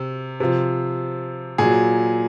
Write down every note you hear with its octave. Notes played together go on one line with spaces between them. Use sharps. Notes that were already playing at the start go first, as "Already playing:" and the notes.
Already playing: C3
C3 F3
A#2 F#3 G#4